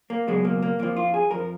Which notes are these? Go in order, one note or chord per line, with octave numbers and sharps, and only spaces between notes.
A#3
C#2 B2 F#3 G#3
A#3
A#3
F2 F3 A#3
F4
G#4
F2 F3 A#4